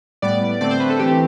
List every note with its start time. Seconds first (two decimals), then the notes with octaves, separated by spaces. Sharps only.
0.22 A2 G3 B3 D5
0.61 D3 A3 C4 D5
0.71 C5
0.80 B4
0.90 A4
0.99 E3 A3 C4 G4